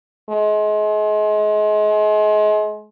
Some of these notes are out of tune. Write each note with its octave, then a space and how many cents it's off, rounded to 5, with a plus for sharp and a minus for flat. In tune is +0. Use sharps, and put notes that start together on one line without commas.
G#3 +35